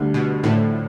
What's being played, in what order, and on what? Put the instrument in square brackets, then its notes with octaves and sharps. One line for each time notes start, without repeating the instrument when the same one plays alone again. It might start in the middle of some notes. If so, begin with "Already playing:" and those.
Already playing: [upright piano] D2 D3 G3
[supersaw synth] B2
[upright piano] D2 D3 F3 A3 D4 [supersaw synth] A2